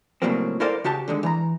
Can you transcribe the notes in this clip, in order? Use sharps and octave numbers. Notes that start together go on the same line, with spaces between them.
C#2 A2 F#3 G3 A#3 C4
E4 A4 A#4 C5 D5 F5
C#3 F#4 G4 A5
D3 D#3 G#3
E3 A#5